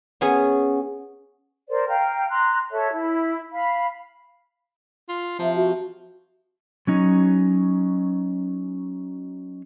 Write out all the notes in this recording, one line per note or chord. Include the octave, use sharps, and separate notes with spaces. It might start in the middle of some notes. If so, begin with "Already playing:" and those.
B3 C#4 G#4
A#4 C5 D5
F5 G5 A#5 F6
A#5 C6 F#6
A4 C#5 E5
E4
F5 B5
F4
C3 F3
F#4
F#3 C#4 D#4